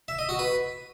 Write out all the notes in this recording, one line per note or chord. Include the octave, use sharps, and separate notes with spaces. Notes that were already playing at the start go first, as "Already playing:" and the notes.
E5
D#5
F#4
B4